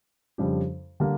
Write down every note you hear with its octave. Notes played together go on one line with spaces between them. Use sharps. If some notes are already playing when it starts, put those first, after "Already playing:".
F2 C#3 G3 D4 G4
D3 G3 A#3